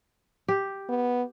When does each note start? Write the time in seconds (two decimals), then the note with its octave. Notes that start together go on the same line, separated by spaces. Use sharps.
0.48 G4
0.89 B3